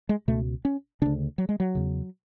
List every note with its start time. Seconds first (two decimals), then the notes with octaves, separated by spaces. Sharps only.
0.09 G#3
0.28 C#2 B2 A3
0.65 C#4
1.02 D2 C#3 D4
1.38 F#3
1.49 G#3
1.60 F#3
1.75 E2 C#3